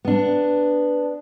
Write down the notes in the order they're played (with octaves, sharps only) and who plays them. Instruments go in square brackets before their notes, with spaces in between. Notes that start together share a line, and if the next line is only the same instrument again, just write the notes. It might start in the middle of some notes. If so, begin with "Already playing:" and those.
[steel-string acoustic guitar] B3 D4